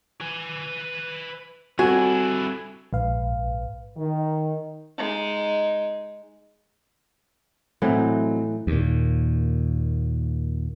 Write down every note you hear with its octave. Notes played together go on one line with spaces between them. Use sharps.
B4 G#5
G3 C4 D4 E4 F#4 A4 G#5
A#1 G#2 B4 F5
D#3
G#3 D#4
A2 E3 F#3 C4 D#4
D#2 A#2